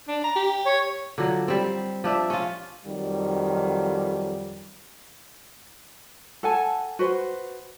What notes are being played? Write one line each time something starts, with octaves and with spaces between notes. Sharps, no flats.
D4
A#5
G4
C#5
D3 F3 F#3
G3 C4
F3 D4 E5
C#4 F4
F2 D#3 F#3 G3
A4 F#5 G#5 A5
F#4 B4 C5